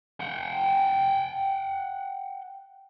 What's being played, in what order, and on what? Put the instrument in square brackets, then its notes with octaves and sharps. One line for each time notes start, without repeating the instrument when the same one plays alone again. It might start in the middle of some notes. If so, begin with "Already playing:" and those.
[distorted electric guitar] F#5 G5